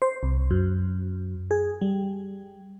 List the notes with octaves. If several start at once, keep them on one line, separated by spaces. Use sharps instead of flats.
C5
C2
F#2
G#4
G3